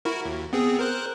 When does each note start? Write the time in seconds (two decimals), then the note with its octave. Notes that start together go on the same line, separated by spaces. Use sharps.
0.05 E4 F#4 A#4
0.25 D#2
0.53 B3 C4 G#4
0.79 A#4 C5 F#6